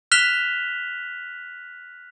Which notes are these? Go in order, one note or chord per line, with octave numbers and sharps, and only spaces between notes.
F6 F#6 B6 E7 F7 G7